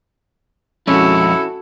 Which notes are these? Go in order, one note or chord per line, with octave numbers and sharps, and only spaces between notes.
F2 G#3 C#4 E4 F#4 A4